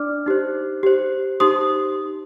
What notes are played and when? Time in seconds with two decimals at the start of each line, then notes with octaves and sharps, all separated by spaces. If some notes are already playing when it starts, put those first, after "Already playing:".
Already playing: D4 D5 D6 F6
0.26 D#4 G4 C5
0.83 G4 C5
1.40 D#4 G4 C5 C6 D#6